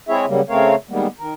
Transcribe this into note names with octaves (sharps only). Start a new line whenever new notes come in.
G#3 C4 E4 G#4 C#5 E5
C#3 F#3 G3 A#3
C#3 A3 C4 A#4 C#5 F5
D#3 G3 G#3 A#3 B3
D#3 A#4